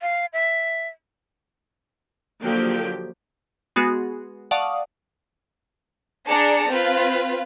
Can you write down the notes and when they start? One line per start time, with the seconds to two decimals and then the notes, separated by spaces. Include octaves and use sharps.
0.01 F5
0.33 E5
2.40 D3 F3 F#3 A#3 G4 G5
3.76 G#3 B3 F#4 G#4
4.51 D5 F5 F#5 A5 C#6 D#6
6.27 D4 G#4 D5 A5 A#5 C#7
6.68 C4 F4 B4